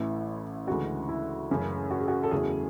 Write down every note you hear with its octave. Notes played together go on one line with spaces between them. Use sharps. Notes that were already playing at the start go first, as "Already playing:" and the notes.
Already playing: A1 A2 E3 E4
D2 C#3 E3 G#3 F#4
E4
F#1 F#2 C#3 E3 A3
F#4
G#4
F#4
A4
F#1 E2 C#3 F#3 A3 G#4